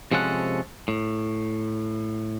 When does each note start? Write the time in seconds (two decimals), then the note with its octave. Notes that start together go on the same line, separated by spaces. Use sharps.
0.12 C3 F3 G#3 C#4 A4 F#5
0.88 A2